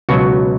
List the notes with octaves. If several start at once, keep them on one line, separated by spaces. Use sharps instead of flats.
C#2 B2 F#3 F#4